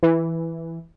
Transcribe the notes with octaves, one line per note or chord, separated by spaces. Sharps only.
E3